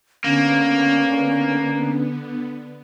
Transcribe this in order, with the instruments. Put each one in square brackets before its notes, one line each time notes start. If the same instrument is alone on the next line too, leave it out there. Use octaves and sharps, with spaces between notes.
[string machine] D3 B3 [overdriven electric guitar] A#3 [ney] C#4